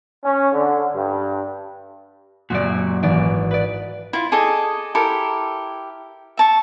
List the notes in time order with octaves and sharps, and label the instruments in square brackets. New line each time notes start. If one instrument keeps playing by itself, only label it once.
[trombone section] C#4
D3
G2
[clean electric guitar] F#2 A#2 [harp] F#4 D5
[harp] G#1 E3 D5
B4 D5
[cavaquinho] E4 F4
G#4 A4 D5 D#5
E4 G4 A4 A#4
E5 A5 C#6